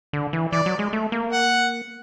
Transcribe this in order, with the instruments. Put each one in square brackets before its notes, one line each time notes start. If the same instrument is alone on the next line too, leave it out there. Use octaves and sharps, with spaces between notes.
[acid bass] D3
E3
[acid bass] E3 [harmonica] D5
[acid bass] F#3
G#3
A3
A#3
[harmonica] F#5